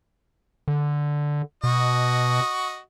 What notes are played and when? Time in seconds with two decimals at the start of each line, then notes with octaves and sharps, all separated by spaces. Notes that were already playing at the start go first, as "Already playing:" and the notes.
0.68 D3
1.64 B2 F#4 D#5